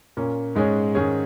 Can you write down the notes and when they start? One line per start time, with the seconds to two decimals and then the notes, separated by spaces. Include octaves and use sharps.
0.17 A#2 A#3 C#4
0.55 G#2 G#3 C#4 G#4 C#5
0.95 G#2 D#3 C#4 G#4 C#5